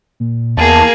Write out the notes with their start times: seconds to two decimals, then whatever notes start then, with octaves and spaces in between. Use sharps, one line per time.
0.20 A#2
0.57 E2 A#3 G#4 A5